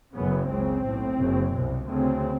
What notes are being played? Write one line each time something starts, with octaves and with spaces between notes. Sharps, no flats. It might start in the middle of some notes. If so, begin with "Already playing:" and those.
F#1 F#2 C#3 B3
C#2 C#3 C4
B1 A2
F#1 F#2 C#3
C2 B2
D2 C#3 C4